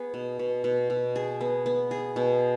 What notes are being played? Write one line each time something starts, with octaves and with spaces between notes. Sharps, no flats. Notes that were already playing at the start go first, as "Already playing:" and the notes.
Already playing: B3 G#4
B2
B2
B2
B2
G#4
B3
B3
G#4
B2